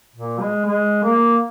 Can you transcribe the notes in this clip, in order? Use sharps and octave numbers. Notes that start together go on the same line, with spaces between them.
A#2
G#3
G#3
A#3